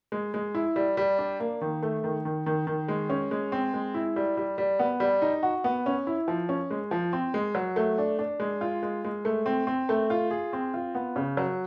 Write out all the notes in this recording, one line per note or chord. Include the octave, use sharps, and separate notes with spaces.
G#3
G#3
E4
G3
G3
D4
A#3
D#3
A3
D#3
D#3
D#3
D#3
G#3
C#4
G#3
C4
G#3
E4
G3
G3
G3
B3
G3
D#4
F#4
B3
C#4
E4
F3
C#4
G#3
F3
C4
G#3
F#3
A3
D4
D4
G#3
F4
G#3
G#3
A3
C4
C4
A3
F4
G#4
C4
F4
B3
C#3
F#3